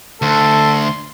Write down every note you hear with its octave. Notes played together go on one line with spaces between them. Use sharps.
D2 A4 C6